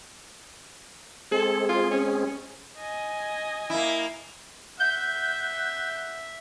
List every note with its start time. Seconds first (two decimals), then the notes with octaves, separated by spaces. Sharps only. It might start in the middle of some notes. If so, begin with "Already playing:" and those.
1.31 G#3 C4 G#4 A4
1.69 F4
1.91 C#4
2.79 D#5 G#5
3.70 A#3 E4
4.80 E5 F#5 G6